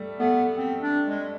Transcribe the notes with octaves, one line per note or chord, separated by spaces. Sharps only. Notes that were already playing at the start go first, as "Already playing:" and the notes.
Already playing: G3 A3
A3 B3
C4
D4
G#3